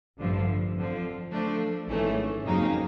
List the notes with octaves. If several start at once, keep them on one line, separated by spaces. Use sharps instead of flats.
A1 G2 D3 F3
F2 D3 F3
F3 A3 D4
G#1 G#2 E3 A3 C#4
F2 C#3 F#3 A#3 D#4